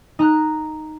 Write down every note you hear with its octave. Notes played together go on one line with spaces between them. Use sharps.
D#4 A#5 F#6